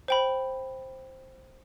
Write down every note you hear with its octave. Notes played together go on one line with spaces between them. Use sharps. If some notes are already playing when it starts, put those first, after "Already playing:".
C5 G5 B5